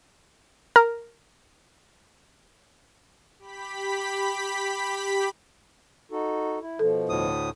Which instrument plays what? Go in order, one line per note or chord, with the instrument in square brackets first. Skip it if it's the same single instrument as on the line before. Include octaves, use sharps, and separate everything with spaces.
[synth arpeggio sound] A#4
[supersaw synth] G4 B5 B6
[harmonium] D#4 F#4 A4
E4
[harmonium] B2 F3 [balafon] A4
[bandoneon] D2 A2 D#6